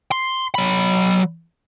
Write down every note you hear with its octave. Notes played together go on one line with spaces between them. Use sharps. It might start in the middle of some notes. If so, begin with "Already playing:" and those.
C6
F#3 B5